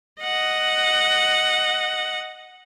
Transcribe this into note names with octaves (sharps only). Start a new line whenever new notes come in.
D#5 F#5